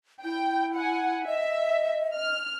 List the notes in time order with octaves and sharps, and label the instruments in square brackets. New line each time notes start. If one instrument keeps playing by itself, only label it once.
[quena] E4 [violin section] G5
[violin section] F#5 G#5
[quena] D#5 [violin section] E5
[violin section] F6